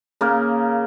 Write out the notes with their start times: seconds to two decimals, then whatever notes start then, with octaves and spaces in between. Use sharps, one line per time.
0.21 C#3 A#3